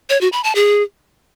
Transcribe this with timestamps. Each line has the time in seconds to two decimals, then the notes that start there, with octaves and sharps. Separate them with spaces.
0.10 C#5
0.21 F#4
0.32 B5
0.44 A5
0.55 G#4